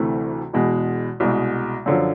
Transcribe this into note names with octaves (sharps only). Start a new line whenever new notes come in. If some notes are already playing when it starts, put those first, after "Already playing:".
Already playing: D2 C3 E3 A3
E2 B2 G#3
C2 B2 G#3
F#2 D3 F3